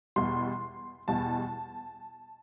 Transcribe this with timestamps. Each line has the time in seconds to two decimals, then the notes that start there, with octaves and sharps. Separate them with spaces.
0.16 E2 B2 G3 C6
1.08 E2 B2 G3 A5